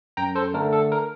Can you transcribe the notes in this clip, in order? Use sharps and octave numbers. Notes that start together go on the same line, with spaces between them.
F#2 G5 A#5
A4 C5
D3 A3 D4 A#4
A4
A#4